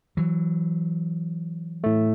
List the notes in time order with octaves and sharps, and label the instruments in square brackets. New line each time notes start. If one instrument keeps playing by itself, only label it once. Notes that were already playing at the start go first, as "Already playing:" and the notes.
[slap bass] E3 F#3
[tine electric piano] A2 A3